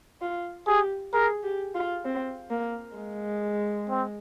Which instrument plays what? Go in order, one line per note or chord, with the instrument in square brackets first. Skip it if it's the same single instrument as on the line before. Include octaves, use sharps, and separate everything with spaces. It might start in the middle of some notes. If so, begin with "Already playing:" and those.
[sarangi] F4
[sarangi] G4 [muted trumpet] G#4
[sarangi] G#4 [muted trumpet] A#4
[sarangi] G4
F4
C4
A#3
G#3
[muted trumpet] C4